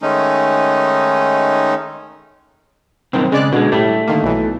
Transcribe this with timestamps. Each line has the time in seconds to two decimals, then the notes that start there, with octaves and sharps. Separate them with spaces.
0.02 D#3 G#3 A3 C#4 D#4
3.13 B1 G2 D#3 C4
3.32 C#3 G#3 D5 F#6
3.52 B2 D3 G#3
3.72 A2 G3 A3
4.07 D3 D#3 A#3
4.23 B1 E3